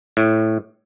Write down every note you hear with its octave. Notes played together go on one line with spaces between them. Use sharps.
A2